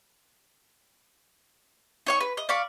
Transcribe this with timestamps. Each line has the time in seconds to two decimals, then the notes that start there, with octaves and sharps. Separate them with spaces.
2.06 D#4 C#5 C#6
2.20 B4
2.37 D#5
2.49 D5 F5 B5 C#6